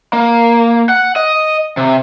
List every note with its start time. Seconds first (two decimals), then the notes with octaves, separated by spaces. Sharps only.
0.13 A#3
0.89 F#5
1.16 D#5
1.77 C3